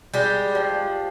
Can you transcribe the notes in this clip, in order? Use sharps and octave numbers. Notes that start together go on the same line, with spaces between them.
G3 G#3 G4
F3